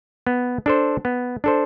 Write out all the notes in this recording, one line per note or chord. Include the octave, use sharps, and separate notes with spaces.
B3
D4 A4 C5
B3
D4 A4 C5